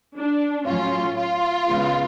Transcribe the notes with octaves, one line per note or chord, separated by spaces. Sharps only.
D4
A2 F#3 C#4 F4
F4
C#3 G#3 B3